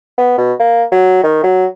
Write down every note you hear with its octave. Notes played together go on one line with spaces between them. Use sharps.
B3
B2
A#3
F#3
D#3
F#3